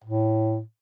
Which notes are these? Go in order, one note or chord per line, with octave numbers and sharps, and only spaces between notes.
A2